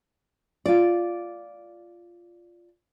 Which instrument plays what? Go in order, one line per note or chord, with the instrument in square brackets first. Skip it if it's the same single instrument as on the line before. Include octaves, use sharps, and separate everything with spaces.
[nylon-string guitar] F4 D5